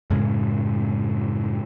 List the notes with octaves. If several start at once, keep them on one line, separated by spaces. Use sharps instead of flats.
F#2 A2 C#3 G#3